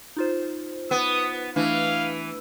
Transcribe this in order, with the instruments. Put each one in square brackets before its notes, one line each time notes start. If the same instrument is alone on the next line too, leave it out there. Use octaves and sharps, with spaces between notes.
[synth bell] D#4 F4 C5
[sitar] B3 [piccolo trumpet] D#6
[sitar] E3 [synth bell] A3 D4 E4 [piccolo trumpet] F5